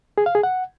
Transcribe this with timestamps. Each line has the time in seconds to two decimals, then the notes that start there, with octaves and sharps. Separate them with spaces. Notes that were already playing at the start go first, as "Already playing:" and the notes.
0.18 G#4
0.26 F5
0.35 G#4
0.43 F#5